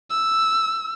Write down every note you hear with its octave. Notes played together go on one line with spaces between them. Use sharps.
E6